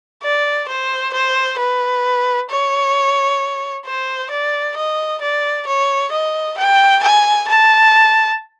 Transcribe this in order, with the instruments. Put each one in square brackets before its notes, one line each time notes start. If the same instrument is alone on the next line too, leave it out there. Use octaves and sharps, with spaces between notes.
[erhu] D5
C5
C5
B4
C#5
C5
D5
D#5
D5
C#5
D#5
G5
G#5
A5